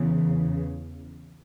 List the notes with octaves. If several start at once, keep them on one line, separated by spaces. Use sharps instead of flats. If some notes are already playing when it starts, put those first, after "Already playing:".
Already playing: E2 C#3 E3